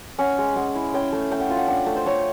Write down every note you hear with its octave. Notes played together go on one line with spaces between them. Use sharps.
C#4 F#5
G#3
G#3 F#5
E4
C#4 G5
A3
A3 G5
F#5
F4 F5
F#5
D4 F#5
A3
C5
A3 C#5